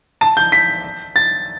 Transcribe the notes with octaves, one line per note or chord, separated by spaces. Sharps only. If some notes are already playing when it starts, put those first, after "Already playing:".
A5
G6
B6
A6